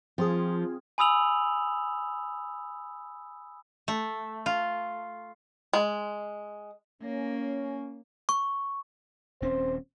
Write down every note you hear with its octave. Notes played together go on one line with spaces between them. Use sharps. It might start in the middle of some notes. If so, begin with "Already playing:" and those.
F3 C4 F4 G#4
G#5 B5 D#6 E6 F7 F#7
A3
F4
G#3
A#3 C#4
C#6
D#1 C4 C#4 C5